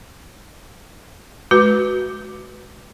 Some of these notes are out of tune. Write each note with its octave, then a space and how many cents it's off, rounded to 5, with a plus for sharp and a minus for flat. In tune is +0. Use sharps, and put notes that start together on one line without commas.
G#3 +30 F#4 +5 B4 +0